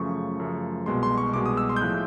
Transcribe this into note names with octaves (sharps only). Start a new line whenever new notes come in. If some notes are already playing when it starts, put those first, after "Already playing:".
Already playing: F#2 C#3 F3 A3 C#6
F#2 C#3 F3 A3
C2 B2 G#3 C6
C6
C#6
C2 B2 G#3 D6
D#6
E6
C6
G6
A2 F3 G#3 F#6